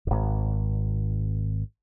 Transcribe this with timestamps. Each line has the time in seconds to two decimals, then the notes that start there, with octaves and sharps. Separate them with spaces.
0.07 D1 G#1